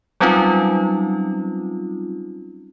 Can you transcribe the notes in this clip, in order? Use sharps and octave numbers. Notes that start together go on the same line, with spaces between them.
F#3 G3 C4 C#4 D#4 F4